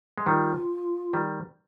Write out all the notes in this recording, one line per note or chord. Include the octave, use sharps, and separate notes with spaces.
G#3
D#3 G3 F4
D#3 G3